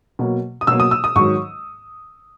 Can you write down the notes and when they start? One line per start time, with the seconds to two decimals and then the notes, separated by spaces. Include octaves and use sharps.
0.19 B2 F#3 A#3
0.61 D#6
0.67 B2 F#3 A#3 E6
0.80 D#6
0.91 E6
1.04 D#6
1.16 G#2 D#3 F#3 C#6